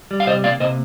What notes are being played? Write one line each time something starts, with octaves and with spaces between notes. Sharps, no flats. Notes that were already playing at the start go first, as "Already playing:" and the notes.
G3
F5
C3 C5 D#5
A#3 D5 F5
C3 C5 D#5